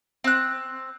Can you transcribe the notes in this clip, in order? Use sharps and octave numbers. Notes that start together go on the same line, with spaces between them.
C4 F#6